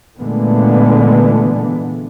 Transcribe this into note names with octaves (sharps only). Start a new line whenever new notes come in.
A#2 D3 E3 G#3 A3 B3